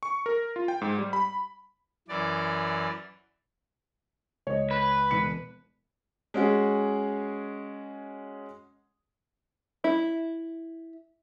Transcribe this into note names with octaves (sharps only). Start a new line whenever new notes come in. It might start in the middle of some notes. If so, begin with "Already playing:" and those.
C#6
A#4
F4
G5
G#2
G3
B5
F#2 E3 D5
C#2 C#5 D#5
B4
E1 C#7
G#3 C#4 F#4 G#4
E4